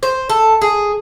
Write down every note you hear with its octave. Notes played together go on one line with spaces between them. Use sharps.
C5
A4
G#4